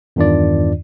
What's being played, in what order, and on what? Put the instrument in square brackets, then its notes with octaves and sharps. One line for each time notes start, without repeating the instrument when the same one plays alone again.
[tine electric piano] E2 G2 D#3 D4 F4 D5